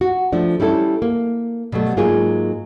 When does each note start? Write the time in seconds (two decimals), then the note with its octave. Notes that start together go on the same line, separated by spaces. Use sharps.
0.01 F#4
0.32 F3 A3 D4
0.60 G3 C#4 E4 G#4 A4
1.02 A#3
1.72 B2 F#3 G3 A3
1.97 G#2 F#3 A#3 F4 G#4